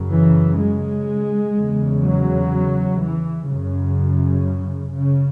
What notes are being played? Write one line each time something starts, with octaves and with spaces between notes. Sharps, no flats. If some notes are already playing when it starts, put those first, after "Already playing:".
Already playing: F#2 C#3
E3
G#3
E2 C#3
F#3
E3
F#2 C#3
C#3